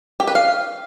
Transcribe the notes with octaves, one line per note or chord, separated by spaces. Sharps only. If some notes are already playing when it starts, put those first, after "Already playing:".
G4
B4
F5